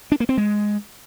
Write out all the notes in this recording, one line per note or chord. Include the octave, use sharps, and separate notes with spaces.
D4
A#3
C4
G#3